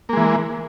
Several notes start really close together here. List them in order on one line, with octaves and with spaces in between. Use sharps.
A#3 G#3 E3